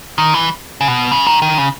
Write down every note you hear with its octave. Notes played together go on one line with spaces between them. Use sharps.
D#3
E3
C#3
B2
C#3
D#3
D#3
C#3